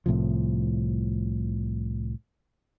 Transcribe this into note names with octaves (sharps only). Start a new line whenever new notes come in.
C2 A2 C3 F3